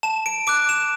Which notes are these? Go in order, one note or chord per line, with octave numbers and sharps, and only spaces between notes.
A5 E7
D7
D6 F#6 D7
E7